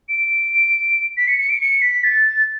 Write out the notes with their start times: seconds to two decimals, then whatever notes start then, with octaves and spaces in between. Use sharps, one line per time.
0.09 D7
1.17 B6
1.28 C#7
1.39 C#7
1.49 D7
1.61 C#7
1.82 B6
2.04 A6